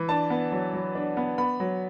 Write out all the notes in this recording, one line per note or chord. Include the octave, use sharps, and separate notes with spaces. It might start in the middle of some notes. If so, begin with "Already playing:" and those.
Already playing: E3
D4 A5
B3
F#3
F#3
D4
B3
B3 B5
F#3